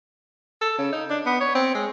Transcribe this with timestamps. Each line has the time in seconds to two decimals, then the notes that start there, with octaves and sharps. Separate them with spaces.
0.62 A4
0.78 C#3
0.92 D#4
1.10 D4
1.26 B3
1.41 C#5
1.55 C4
1.75 G#3